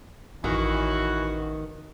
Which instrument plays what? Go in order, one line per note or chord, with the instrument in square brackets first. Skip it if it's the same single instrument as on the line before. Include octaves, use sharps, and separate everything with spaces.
[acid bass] A1 [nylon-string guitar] D#3 [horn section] E3 F#4